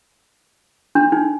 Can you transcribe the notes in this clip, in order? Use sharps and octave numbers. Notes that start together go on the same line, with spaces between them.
D4
D#4